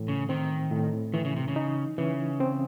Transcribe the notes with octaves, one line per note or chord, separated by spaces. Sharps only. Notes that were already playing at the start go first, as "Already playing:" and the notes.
Already playing: A2 E3
C#3
D#3 C4
A2
D#3 E3
C#3
C3
C#3
D#4
C#3 E3
C4